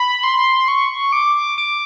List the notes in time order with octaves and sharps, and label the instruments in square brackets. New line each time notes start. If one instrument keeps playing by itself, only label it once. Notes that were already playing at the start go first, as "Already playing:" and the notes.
Already playing: [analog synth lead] B5
C6
C#6
D6
D6